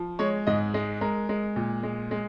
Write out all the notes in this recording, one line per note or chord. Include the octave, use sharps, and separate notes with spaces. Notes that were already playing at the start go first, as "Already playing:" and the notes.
Already playing: F3
G#3 C#5
G#2 D#5
G#3 D#5
G#3 A#4
G#3
A#2
G#3
G#3